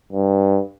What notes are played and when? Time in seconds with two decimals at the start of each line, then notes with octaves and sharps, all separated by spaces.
0.13 G2